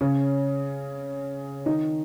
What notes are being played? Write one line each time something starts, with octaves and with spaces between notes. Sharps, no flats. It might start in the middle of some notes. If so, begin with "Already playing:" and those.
C#3 C#4
D#3 D#4